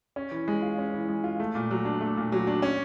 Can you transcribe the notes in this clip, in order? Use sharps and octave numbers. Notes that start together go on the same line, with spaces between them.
C#4
E3
G#3
F4
C#4
E3
G#3
F4
A3
A#2
F#3
D4
A3
A#2
F#3
D4
C#4